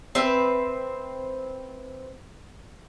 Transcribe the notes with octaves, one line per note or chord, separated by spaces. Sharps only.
C4 B4 E5